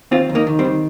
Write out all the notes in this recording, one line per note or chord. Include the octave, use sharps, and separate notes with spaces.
D#2 C4 F4
D#2
A#3 D#4
D#3
G3 C4
D#3